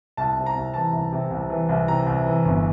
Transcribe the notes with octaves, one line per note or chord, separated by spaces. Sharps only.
C2 A5
C3
A#5
C2
E3 A5
C2
C3
C2
E3
C2
C3 A#5
C2
E3
G1